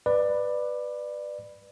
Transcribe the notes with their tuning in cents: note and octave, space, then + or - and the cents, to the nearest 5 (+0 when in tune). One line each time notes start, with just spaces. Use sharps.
B4 +0 D5 +20